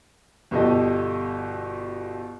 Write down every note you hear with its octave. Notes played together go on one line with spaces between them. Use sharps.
G1 B2 G4 A4 D#5